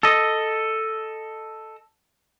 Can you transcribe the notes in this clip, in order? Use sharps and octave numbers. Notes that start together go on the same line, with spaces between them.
A4 D#5